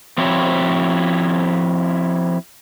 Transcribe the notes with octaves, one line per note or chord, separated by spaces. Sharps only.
F3 C4 E4 F#4 C#5